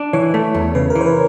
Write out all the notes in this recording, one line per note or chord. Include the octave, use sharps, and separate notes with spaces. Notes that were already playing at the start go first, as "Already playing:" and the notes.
Already playing: D4
E3 C#5
A3
E2
C#3 B4
A#4
E3
C5
B4